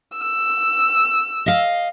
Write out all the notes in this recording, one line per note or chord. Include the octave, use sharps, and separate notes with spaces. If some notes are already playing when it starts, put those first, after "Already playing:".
E6
D#5 F5